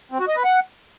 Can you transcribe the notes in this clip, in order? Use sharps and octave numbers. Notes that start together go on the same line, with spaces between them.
C4
F#4
D#5
B4
F#5